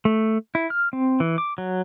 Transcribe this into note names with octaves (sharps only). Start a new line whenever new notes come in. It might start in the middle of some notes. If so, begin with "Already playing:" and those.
A3
E4
F6
C4
E3
D6
F#3